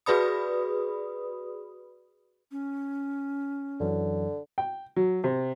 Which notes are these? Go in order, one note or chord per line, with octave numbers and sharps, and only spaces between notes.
F#4 G#4 B4 D5 B5 D#6
C#4
F#2 D3 E3 F#3
G5
F#3
C3